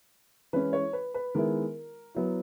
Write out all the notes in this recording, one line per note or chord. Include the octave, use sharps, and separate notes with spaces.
E3 G#3 C#4 E4 B4
C#5
B4
B4
D#3 G#3 B3 E4 A#4
F#3 B3 E4